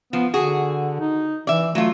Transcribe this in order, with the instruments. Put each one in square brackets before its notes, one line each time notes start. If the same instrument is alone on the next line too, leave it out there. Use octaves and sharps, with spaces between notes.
[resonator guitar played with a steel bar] F3 [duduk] B3
[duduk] D3 [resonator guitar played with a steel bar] F#4 G#4
[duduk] D#4
[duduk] E3 [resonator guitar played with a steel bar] D5 E5
[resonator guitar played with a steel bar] F#3 F4 [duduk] A3